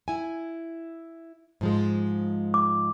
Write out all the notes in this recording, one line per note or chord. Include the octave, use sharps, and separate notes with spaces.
E4 G#5
G#2 F3 G#3
D6